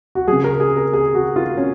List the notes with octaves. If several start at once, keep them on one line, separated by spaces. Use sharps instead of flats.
F#4
C#3 F#3 G#4
A#4
G#4
A#4
G#4
F#4
F4
C#4